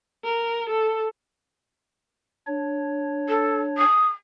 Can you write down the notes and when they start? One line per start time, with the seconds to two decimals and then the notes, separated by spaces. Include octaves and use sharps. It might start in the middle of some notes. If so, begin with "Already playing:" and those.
0.24 A#4
0.69 A4
2.47 D4 C#5
3.29 A4
3.78 D#6